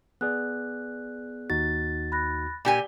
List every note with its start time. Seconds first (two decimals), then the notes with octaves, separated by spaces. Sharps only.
0.21 B3 G#4 D5 F#6
1.50 D#2 D#4 F#4 A6
2.12 B5 F#6 A#6
2.65 A#2 G4 D5 G#5